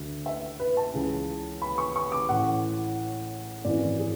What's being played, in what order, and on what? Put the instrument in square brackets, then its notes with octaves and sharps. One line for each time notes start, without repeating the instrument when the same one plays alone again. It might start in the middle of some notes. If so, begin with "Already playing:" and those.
Already playing: [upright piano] D2 D3
E5
B4
A5
C#2 C#3 E3
B5
C#6
C#6
D6
A1 A2 E3 F#5
G#1 F#2 E3 D5
G#4